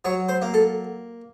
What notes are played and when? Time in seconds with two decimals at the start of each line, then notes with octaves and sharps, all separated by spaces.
0.05 F#3 C#5
0.29 C5
0.42 A#3
0.54 A4